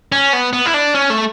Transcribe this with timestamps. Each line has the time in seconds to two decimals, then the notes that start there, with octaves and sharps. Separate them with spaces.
0.12 C#4
0.33 B3
0.53 B3
0.66 E4
0.74 D4
0.95 C#4
1.10 A3